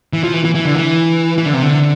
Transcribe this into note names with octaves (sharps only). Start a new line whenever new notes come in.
E3
F3
E3
E3
E3
D3
E3
E3
D3
C3
D3